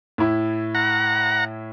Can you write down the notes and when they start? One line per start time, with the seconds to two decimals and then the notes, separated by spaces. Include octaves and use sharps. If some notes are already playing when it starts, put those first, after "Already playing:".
0.18 A2 E4
0.75 F#5 A#5